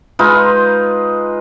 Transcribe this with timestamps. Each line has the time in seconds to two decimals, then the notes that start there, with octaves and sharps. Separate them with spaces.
0.19 G#3 D#4 F4 B4